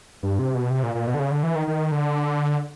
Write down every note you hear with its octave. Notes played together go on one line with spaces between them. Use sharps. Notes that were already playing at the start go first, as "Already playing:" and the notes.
G2
C3
B2
C3
A#2
A#2
B2
D3
C#3
D3
E3
D#3
D#3
D3